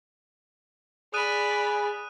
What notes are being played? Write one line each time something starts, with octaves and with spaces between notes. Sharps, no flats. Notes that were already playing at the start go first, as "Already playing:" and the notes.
G#4 D5 B5 D#6 F#6 D#7